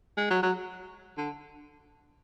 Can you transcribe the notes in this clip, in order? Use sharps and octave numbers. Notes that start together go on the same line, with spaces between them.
G#3
F#3
F#3
D3